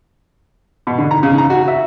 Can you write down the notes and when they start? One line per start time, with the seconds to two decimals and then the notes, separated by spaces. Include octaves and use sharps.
0.87 B2
0.98 D3
1.11 A#5
1.23 C#3
1.38 A#5
1.50 F#4
1.68 E5